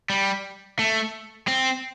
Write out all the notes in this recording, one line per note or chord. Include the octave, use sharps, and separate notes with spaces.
G3
A3
C4